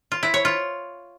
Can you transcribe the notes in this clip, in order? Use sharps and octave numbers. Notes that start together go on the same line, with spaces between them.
F4
E4
C#5
F4